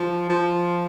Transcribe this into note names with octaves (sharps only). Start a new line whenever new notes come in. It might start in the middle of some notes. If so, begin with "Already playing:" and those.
Already playing: F3
F3